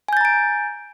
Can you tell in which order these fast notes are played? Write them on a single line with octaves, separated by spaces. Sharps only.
G#5 G6 A6 A#5 D7